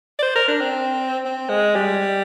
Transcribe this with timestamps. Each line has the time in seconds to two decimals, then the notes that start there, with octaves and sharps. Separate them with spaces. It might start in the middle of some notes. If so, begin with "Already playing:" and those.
0.19 D5
0.23 C5
0.35 A#4
0.48 D4
0.61 C4
1.25 C4
1.49 G#3
1.75 G3